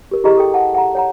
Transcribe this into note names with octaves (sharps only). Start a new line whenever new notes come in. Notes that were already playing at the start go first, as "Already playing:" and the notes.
G4 A#4
E4 G4 G#4 D#5 A#5 C#6
A4 G5
F5 F#5 A5
F#5 A#5
C#5 F#5 A#5